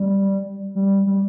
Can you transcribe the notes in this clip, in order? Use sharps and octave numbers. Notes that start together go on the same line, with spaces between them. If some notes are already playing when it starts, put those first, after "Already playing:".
Already playing: G3
G3
G3